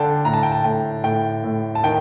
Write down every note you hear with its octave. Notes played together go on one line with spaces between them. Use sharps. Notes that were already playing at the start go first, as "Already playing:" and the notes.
Already playing: D3 D4 G5 A5
A2 A#5
A5
G5
A5
A2 G5
A2 G5
A2
A5
D#3 G5